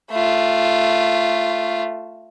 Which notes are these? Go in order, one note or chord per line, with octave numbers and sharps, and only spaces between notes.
A3 F4